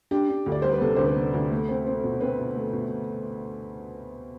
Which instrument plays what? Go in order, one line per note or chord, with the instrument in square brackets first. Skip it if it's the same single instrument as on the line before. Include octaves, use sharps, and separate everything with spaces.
[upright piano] D4 G4
D4
D2
D5
G3 C5
B4
C3 A4
D2 C5
B4
C3
D2
A3
C4
C4
B2
C4 B4
B2
A3
B2